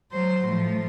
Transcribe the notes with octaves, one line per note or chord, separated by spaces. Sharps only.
F#3 C5
A2 F3